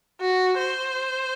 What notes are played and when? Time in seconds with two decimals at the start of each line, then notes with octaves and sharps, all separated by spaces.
0.21 F#4
0.58 C5